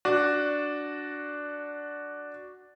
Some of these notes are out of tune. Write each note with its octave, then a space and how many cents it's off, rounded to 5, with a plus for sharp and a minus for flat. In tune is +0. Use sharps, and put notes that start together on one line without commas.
D4 +0 F#4 +0